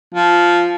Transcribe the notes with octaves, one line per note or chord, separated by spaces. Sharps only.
F3